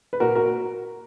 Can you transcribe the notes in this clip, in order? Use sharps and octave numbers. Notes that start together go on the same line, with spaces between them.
B4
A#2 F#4 A#4
F#4 A#4